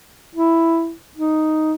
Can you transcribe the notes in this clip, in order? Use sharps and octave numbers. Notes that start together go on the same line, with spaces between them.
E4
D#4